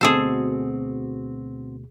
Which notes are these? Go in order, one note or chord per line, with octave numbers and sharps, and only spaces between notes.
D2 B2 C4 F#4 G#4 A4 C5